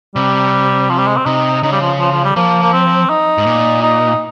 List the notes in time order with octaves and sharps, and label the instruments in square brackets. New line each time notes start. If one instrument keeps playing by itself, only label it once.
[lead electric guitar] C3 [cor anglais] G3
[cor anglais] F3
G3
G#3
C4
[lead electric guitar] C3 [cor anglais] D#4
[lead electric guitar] C#3 [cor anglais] D#4
[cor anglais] G3
F3
F3
F3
G3
[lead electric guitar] F3 [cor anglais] A#3
[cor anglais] A#3
C4
D#4
[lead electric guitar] G#2
A#2
[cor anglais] D#4